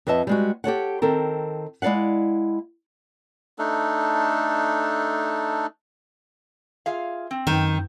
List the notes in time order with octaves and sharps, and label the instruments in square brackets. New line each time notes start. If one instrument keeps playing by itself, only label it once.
[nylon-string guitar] F2 B4 D#5 E5 A5
G3 G#3 F#4
G4 A4 C#5 F#5
D#3 C4 A4 A#4
G#3 E4 D5 F5 F#5
[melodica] A3 D4 D#4 A4
[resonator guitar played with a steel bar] F4 G#4 F5 [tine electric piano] E5
[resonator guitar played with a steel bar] C4
[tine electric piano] F#2 G6 [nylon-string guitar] D#3